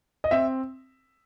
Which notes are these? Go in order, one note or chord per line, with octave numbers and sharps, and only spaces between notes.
D#5
C4 E5